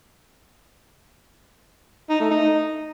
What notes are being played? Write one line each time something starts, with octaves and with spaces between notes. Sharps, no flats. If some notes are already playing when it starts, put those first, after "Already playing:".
D#4
A3
D#4